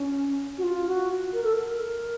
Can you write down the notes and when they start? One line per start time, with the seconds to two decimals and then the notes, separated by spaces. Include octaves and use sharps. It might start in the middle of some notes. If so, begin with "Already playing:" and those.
Already playing: C#4
0.58 F#4
0.63 F4
0.87 F#4
1.33 A#4
1.44 A4
1.53 A#4